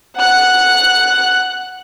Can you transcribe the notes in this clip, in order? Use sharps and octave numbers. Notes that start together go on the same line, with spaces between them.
F#5 F#6